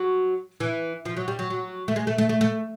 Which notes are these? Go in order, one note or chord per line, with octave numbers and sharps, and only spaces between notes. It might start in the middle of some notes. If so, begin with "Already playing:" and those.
Already playing: F#3
E3
F3
F#3
G3
F#3
F#3
A3
G#3
A3
A3
A3
A3